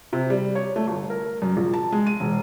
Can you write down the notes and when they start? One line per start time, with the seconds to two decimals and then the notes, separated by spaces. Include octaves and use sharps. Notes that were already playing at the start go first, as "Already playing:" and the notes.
0.13 C3
0.30 G3
0.55 C#5
0.76 A3
0.87 G1
1.10 A#4
1.42 F#2
1.57 A#1
1.74 A5
1.92 G#3
2.06 D#7
2.20 E1